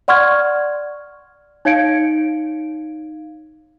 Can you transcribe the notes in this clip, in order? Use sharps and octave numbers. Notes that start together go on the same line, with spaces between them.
D5 F#5 C6 C#6 F6 G#6
D#4 C#5 F5 G#6 C#7 D7